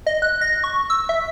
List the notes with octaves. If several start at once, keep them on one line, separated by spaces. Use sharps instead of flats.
D#5
F#6
A#6
C#6
E6
E5